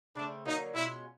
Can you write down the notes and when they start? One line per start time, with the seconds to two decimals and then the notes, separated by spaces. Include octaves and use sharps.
0.15 C#3 E3 A3 C4 D4
0.45 D3 F#3 A#3 D#4
0.75 B2 G#3 C#4 E4 F4